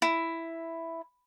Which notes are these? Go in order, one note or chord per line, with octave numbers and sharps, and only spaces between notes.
E4